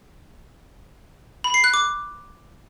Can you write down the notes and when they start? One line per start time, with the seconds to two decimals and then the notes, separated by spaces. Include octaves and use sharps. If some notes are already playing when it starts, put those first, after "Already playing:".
1.44 B5
1.54 C7
1.64 F#6
1.74 D6